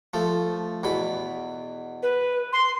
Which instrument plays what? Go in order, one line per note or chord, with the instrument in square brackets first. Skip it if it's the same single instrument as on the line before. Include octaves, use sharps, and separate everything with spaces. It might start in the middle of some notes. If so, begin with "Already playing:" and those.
[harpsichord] F3 A3
E2 B2 B5
[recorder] B4
C6